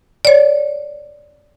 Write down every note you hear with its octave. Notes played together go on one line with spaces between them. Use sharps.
C#5 D5